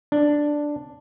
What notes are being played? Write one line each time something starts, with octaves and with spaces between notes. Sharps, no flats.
D4